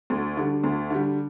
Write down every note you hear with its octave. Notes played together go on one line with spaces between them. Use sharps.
D2
D3 G3
D2
D3 G3